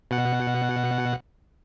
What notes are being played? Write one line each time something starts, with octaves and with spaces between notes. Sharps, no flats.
B2 F#5